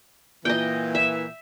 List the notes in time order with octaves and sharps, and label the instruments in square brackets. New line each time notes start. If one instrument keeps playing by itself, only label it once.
[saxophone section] A#2 E3 [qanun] D#5 G5
[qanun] E5